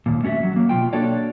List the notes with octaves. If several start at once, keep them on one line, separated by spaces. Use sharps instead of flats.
D#2 A#2
A3 C#4 F#4 E5
F#3
F#3 A#3
B2 D#3 F4 G5
A#3 D4 F#4 A4 C#5 D5